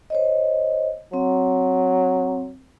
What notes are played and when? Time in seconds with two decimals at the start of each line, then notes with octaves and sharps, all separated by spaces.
0.10 C5 C#5 D#5
1.14 F#3 C4